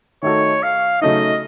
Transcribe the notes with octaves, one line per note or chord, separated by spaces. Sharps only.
D#3 A3 D#4 F#4 A4 C#5
F5
C#3 F#3 A3 D#4 D#5